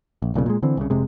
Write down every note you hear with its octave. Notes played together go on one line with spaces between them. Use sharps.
A#1
E1 B1 A#2 C#3
A#2 G#3
D3 E3 C4
C2 C#3
F1 C3 G#3